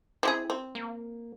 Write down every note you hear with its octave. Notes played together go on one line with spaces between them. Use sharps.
C4 E4 G4 G#4
C4
A#3